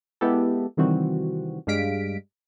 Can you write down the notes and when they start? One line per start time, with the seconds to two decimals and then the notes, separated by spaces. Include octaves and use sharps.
0.21 G#3 B3 E4 G4 A4
0.77 C3 D#3 E3 G3 C4 F#4
1.67 G2 G3 G#3 F5 B6 D7